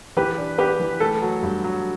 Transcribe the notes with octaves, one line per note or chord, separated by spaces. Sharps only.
E3 G4 B4
D4
B3 G4 B4
E3
A3 A4
F#3
G2
F#3